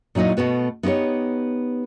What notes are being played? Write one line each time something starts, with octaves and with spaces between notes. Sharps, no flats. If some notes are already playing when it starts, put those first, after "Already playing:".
A#2 F#3 D#4 E4 D#5
B2 A3 B3 F#4
B3 D#4 E4 G4 C#5